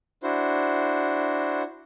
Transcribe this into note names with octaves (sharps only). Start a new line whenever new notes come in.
D4 E4 F#4 C5